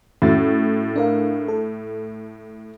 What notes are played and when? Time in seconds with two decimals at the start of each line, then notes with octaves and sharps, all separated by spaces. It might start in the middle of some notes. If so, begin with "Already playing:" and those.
0.22 A2 C#4 F#4 A6
0.96 D4 A#4 F5
1.48 A4